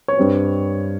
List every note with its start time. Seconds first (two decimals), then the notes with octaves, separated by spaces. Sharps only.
0.08 C#5
0.18 G2 G3 C4